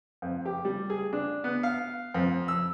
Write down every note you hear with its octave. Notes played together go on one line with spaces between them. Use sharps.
F2
G4
G3
G#4
D4
B3
F5
F2
E6